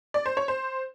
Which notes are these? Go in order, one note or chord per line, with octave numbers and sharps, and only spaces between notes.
D5
C5
C#5
C5